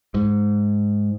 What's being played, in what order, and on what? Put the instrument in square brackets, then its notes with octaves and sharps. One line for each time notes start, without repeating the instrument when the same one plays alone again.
[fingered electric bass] G#2